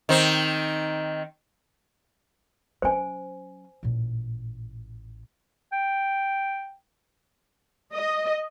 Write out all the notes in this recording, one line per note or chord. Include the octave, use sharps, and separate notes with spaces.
D#3 C4
F#3 C#4 C5 G#5
A1 A#2
G5
D#5